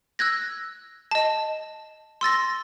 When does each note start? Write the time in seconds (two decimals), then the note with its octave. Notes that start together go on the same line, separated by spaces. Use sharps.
0.19 E6 F#6 G#6 A#6
1.11 D#5 A5
2.21 C6 E6 A6 A#6